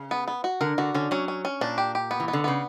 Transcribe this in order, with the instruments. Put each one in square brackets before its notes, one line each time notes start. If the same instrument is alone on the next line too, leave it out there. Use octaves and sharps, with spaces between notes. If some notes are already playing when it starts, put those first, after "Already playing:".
Already playing: [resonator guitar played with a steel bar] C#3
[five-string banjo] B3
B3
F#4
[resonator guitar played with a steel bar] D3 [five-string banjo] A#4
[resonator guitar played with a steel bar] D3 [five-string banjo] F#4
[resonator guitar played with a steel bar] D3 [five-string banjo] C#4
[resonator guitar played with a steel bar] F#3 [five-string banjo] C#4
[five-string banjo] C#4
C#4
[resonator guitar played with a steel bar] A#2 [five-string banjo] D4
[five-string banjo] G4
G4
B3
[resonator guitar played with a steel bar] E3
[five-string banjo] B3
[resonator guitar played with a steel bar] D3
[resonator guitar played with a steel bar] C#3 [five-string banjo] B3